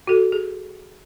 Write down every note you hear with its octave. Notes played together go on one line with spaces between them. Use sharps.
F#4 A4
G#4